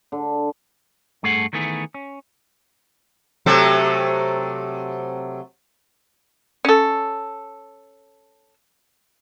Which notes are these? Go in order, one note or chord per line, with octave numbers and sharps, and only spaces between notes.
D3
G2 A3 G#4 A4 F#5
D#3 E3 A3 B3 G#4
C#4
C3 F#3 A3
C#4 A4